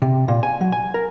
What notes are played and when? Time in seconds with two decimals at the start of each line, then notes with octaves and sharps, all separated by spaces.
0.02 C3
0.28 A#2
0.43 G#5
0.61 F#3
0.72 G#5
0.94 A#4